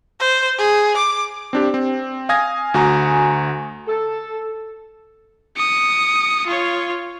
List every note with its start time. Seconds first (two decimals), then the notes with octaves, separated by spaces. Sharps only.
0.20 C5
0.58 G#4
0.97 D6
1.53 C4 D4 G4
1.74 C4
2.29 F5 G#5 D#6 G#6 A#6
2.74 D2 F#4 G#5 A#5
3.88 A4
5.57 D#6 C#7
6.47 F4 C#5